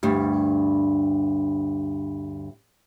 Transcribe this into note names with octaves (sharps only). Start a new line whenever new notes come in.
D2 G2 G3